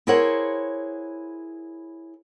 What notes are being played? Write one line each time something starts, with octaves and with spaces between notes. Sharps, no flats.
E4 G#4 A#4 C5 C#5 F#5